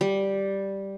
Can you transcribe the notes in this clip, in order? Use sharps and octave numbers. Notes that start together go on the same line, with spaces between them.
G3